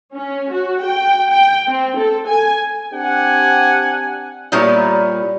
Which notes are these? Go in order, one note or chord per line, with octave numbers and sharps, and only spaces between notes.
C#4
F#4
G5
G5
C4
A4
G#5
C4 D4 G4 F#5 G#5
A#2 G3 A#3 B3 E4 C#5